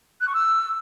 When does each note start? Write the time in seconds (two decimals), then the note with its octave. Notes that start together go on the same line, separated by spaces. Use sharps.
0.20 F#6
0.27 C#6
0.34 E6